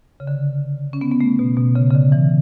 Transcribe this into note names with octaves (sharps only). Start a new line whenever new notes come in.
C#3
D3
C#4
B3
B3
A3
B2
B2
C#3
C#3
D3
E3